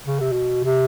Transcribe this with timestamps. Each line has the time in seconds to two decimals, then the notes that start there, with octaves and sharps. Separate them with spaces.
0.06 C#3
0.20 C3
0.33 B2
0.64 C3